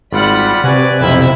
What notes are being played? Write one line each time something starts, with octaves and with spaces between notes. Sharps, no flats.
G#1 G3 F4 D5 F#5 B5
C3 F#4 B4 D5 G#5 F#6
B1 F2 F3 E4 B5